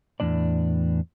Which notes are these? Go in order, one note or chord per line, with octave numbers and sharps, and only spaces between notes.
E2 A2 G3 D4 D5